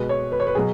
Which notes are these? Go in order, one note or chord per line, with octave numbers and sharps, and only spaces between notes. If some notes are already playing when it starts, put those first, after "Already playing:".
Already playing: B2 G#3 B4
C#5
B4
C#5
B4
B2 F#3 G#4